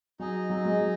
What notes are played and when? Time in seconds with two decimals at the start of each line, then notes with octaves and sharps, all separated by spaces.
0.19 F#3 D#4 G#4 D#5
0.50 F#3
0.65 G#3
0.81 F#3